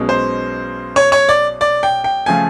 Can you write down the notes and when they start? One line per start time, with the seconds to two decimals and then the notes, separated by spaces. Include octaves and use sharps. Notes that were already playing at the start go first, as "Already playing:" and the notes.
Already playing: B1 B2 G#3 C#4
0.09 C5
0.96 C#5
1.12 C#5
1.29 D5
1.61 D5
1.83 G5
2.04 G5
2.26 C#3 F3 A3 G#5